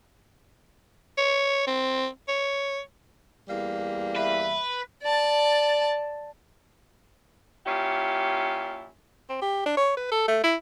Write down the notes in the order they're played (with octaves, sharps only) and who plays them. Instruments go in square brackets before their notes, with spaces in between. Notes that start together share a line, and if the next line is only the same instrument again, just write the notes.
[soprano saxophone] C#5
C4
C#5
[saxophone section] E2 G3 A#3
[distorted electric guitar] B4 [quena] E5
[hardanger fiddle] D5 A5
[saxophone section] A#2 C#4 E4 G4
[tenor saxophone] C4
G4
D4
C#5
B4
A4
A3
E4